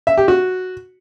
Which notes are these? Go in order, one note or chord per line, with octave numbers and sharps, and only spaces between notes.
E5
G4
F#4